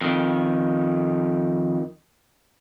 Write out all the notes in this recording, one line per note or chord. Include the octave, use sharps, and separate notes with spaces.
F2 D#3